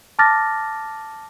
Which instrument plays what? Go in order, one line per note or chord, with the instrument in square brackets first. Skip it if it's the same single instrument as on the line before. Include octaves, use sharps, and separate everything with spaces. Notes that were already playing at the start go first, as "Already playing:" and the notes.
[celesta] A5 D6 F6 A6 A#6